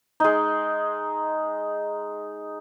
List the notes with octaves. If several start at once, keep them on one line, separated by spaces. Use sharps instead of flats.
G#3 D#4